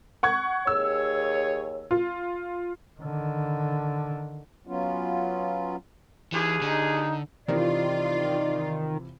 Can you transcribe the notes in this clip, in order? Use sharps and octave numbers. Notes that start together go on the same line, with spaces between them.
F#5 C#6 G#6
D#2 G#4 C#5 E6
F4
D3 D#3
F#3 B3 C#4 F4
D#2 E3 G#4
D3 D#4
C3 D#3 E3 F4 D5